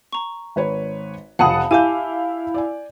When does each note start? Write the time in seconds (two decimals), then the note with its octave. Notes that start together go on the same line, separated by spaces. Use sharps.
0.13 A#5 C#6
0.56 G#1 B4 C#5
1.39 F1 F2 F5 F#5 A5 B5 D#6
1.71 E4 G4 E5 F5 G#5 A5 D6 G6
2.54 D5 G#5